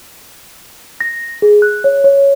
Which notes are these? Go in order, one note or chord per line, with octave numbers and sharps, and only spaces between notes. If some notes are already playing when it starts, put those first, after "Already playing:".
A#6
G#4
F#6
C#5
C#5